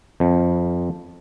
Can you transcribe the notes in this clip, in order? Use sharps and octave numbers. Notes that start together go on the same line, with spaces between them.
F2